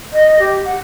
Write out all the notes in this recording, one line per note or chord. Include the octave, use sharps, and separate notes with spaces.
D#5
G4
F#5